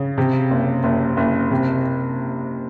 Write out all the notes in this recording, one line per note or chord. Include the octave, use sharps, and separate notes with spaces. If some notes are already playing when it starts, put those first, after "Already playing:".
Already playing: C#3
C3
F#1
F#1
F#1
C3